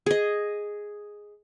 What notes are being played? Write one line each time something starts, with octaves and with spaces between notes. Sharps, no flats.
G#4 D#5